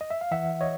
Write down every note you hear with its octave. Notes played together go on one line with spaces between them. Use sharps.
D#5
E5
F5
E3 E5 F#5
C#5 D#5